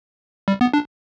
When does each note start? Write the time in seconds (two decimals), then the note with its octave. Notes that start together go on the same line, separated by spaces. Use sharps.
0.48 G3
0.61 B3
0.73 D4